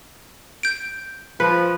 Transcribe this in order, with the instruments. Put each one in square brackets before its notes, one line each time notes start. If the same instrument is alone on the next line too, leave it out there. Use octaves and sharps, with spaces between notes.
[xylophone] G6 D7
[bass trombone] F3 [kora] B4